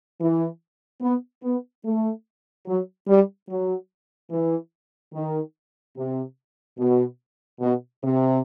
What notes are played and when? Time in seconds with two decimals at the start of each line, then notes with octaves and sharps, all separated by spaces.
0.20 E3
1.01 B3
1.43 B3
1.84 A3
2.66 F#3
3.08 G3
3.49 F#3
4.31 E3
5.13 D#3
5.96 C3
6.78 B2
7.60 B2
8.02 C3